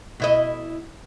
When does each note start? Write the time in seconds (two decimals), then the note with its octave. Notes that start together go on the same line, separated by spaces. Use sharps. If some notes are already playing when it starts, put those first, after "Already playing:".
0.20 B2 E4 D#5